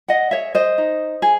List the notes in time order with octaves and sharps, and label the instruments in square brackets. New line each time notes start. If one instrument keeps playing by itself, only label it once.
[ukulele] D#5 F#5
G#4 C#5 E5
C5 D#5
D#4
G#4